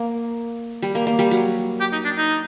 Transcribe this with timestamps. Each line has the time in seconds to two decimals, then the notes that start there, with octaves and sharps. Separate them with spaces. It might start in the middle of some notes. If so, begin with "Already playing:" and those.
Already playing: A#3
0.82 G3
0.95 A#3
1.07 A#3
1.19 G3
1.31 F#3
1.81 G4
1.93 D#4
2.05 D4
2.18 D#4